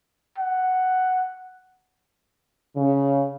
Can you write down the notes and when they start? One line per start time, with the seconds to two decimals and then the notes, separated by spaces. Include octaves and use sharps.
0.39 F#5
2.76 C#3